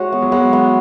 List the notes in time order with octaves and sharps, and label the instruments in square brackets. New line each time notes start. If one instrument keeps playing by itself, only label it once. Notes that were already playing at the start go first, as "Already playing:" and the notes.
Already playing: [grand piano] G#3 [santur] F#4 C#5
[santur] B3
[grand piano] F#3
[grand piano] G#3 [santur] B3
[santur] B3